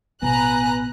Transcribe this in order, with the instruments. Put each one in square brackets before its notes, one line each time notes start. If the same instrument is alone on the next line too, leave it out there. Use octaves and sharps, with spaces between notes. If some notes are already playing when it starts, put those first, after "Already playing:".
[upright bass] A1 B2 [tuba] B3 [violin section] B4 A#5 F#6 [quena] G#5